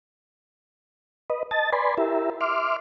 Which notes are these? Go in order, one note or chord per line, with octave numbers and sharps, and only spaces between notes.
B4 D#5
D#5 A5 A6
B4 D5 G#5 B5 C6
E4 G4 A#4 E5
E5 C6 D6 F6